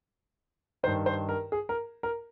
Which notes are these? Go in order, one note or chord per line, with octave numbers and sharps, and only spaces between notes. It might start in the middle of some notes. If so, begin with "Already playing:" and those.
G2 D#3 C5
C5
A#4
G#4
A#4
A#4